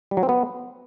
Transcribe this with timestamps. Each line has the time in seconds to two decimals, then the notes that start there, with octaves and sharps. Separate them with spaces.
0.11 G3
0.17 F#3
0.23 C4
0.29 B3